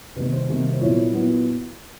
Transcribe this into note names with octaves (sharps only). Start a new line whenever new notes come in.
C3 D#3 G3 A#3 B4
C5
C3 D#3 G3 A#3
C5
A#2 F#3 B3 E4 C#5
A#2 F#3 B3 E4